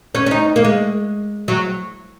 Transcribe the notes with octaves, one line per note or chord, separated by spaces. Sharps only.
C#4
C#4
D#4
A#3
G#3
F#3